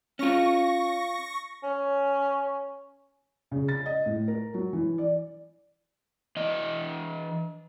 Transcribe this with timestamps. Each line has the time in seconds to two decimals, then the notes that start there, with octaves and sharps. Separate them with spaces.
0.19 C#4 F4 C#6 A#6
1.63 C#4
3.52 C#3
3.68 A6
3.86 D#5
4.06 A2
4.28 A#4
4.54 F#3
4.73 E3
4.98 D5
6.36 E3 D#5